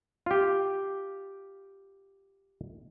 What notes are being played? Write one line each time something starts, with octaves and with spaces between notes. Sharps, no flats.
F4 G4